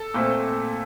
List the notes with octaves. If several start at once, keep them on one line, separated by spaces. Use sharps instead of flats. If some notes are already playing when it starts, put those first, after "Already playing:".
Already playing: A4
A#2 A3 C4